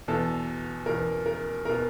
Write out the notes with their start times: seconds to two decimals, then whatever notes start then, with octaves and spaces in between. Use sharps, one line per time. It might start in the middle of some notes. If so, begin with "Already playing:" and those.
0.08 E2 B2 A4
0.86 E2 B2 A#4
1.26 A#4
1.65 B2 A#4